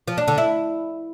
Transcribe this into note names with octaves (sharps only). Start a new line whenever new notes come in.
F3
D4
D3
E4